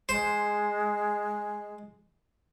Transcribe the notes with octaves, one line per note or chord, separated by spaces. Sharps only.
G#3 C5